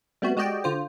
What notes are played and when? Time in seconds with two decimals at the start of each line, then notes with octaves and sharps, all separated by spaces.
0.22 G3 A3 B3 C4 F#4
0.37 G#3 F#4 G4 D5 D#5 G5
0.64 D3 F4 C5